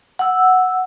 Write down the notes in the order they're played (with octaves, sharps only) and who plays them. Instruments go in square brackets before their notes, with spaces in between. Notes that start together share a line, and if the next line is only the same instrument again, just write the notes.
[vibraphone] F#5 E6